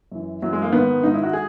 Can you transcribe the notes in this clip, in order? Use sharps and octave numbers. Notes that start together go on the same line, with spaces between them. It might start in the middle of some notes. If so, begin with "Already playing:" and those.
F#2 E3
F#2 E3 F#3
G#3
A#3
G#2 D#3 B3
G#2 D#3 D#4
E4
F#4
G#4